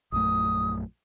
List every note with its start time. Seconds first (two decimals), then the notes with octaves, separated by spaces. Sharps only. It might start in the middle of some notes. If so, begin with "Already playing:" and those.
0.12 A#1 F#2 A3 D#6